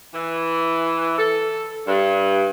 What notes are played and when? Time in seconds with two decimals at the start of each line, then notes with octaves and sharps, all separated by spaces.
0.14 E3
1.18 A4
1.87 G2